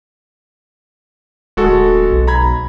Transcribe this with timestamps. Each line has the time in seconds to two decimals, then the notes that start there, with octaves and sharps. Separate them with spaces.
1.57 D1 G#3 F#4 A4
2.11 B1
2.27 A#5 B5 G#6